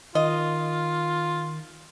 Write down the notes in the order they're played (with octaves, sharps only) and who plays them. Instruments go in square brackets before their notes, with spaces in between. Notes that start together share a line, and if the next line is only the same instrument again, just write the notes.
[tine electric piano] D#3 [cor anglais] F4 [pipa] D#5